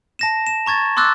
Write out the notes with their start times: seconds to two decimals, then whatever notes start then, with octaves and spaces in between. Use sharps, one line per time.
0.19 A5 A#6 E7
0.47 E7
0.66 A#5 C#6 G#6 A6
0.97 C6 D6 E6 F#6 A6